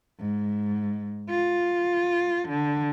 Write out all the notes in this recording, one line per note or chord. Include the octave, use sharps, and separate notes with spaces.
G#2
F4
D3